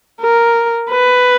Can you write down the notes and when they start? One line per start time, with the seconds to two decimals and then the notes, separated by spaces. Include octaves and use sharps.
0.21 A#4
0.91 B4